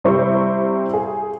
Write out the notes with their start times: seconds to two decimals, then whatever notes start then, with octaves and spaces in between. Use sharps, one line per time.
0.04 C3 G3 C4 E4 C5 C#6
0.94 G#4